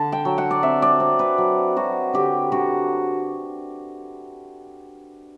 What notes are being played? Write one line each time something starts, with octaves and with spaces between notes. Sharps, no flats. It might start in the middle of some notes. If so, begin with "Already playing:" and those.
Already playing: D3 A5
G5
F#3
F#5
D5
C4 E5
D5
C4
B4
F#3
F#3 F#4
D3 G4
D3 F#4